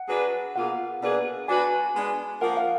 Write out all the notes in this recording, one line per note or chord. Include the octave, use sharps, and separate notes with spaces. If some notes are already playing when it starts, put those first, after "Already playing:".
Already playing: F#5
F#3 D4 G#4 B4
B2 A#3 F4 G#4 F#5
B2 A#3 D4 G#4 B4
F#3 D4 F#4 B4 G#5
G#3 B3 D4
F3 A#3 F4 A#4 F#5
F5